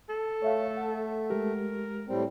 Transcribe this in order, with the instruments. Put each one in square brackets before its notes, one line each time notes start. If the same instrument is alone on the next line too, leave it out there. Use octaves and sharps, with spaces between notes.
[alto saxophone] A4
[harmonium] A3 [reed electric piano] C#5 E5 F5
[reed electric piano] F#5
[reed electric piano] G#3 G4 [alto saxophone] A#4
[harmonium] A2 G3 C4